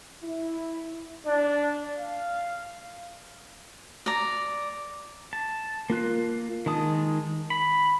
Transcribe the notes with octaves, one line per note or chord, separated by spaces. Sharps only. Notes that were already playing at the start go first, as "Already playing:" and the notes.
E4
D4
F5
D5 A#5
A5
A#3 F4 F#6
D#3 G#3 A5 D#6
B5